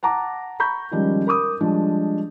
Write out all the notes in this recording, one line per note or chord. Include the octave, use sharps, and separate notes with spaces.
F#5 A5 A#5 D6
A#5 B5 C#6 G6
D#3 F3 G3 G#3 C#4
A#4 B5 D6 D#6
F3 G3 G#3 D4